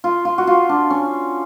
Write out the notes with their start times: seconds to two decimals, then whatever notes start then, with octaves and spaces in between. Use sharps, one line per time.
0.04 F4
0.25 F4
0.38 F#4
0.47 F4
0.69 D4
0.90 C#4